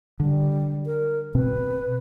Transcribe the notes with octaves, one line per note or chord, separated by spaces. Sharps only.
D3 G3
A#4
B2 C4 B4